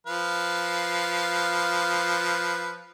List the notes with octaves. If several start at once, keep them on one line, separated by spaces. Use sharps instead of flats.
F3 B4 F5